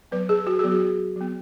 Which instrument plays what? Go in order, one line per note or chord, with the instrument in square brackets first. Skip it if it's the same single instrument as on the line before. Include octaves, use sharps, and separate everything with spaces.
[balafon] F#3 B3 B4
G#4
F#4
F#3 B3 G#4
F#4
F#3 B3